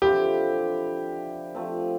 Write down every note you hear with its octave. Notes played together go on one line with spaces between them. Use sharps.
D3 F3 C4 E4 G4
F3 A3 C4